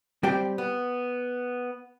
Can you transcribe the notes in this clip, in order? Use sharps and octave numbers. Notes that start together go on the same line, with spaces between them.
G3 C4 G4 C5 G5
B3